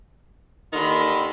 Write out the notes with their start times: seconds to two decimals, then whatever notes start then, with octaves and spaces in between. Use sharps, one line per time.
0.73 D#2 D3 D#3 B5 C6